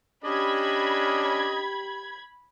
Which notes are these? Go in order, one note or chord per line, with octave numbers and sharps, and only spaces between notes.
C#4 D4 G4 D#5 B5 G#6